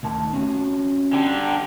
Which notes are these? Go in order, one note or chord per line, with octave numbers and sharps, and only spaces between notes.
D2 D#3 A5
C4 C#4 F#4
D3 G4